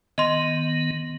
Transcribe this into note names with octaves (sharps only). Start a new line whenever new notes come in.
D#3 B3 D#5 C6